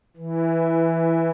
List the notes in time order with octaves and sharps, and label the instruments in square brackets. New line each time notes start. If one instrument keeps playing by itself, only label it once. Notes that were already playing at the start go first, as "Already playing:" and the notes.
[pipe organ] E3